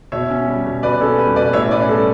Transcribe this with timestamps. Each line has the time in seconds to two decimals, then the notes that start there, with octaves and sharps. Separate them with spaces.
0.12 B2 C#5 E5
0.30 C#4
0.47 G3
0.66 B2
0.83 B2 B4 D5
1.01 C#4 A4
1.18 G3 B4
1.36 B2 B4 D5
1.53 A2 C#5 E5
1.71 C#4 B4 D5
1.89 G3 A4